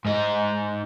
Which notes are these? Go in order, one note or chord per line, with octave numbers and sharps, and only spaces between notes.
G#2 D#4